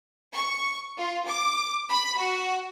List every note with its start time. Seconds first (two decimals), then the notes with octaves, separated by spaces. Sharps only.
0.33 C#6
0.97 F4
1.27 D6
1.90 B5
2.18 F#4